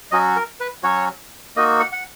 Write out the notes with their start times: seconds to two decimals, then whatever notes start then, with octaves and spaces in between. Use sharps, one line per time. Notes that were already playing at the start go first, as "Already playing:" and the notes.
0.11 F#3 C#4 F#4 D#5
0.36 A#4
0.60 B4
0.83 F#3 C#4 F#4 C#5
1.56 A#3 D#4 F#4 D#5
1.80 F#5
1.92 F#5